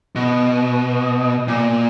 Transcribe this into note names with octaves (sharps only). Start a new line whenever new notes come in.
B2
A#2